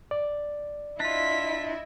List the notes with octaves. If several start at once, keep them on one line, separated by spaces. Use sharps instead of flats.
D5
D4 E4 F4 D#5 B6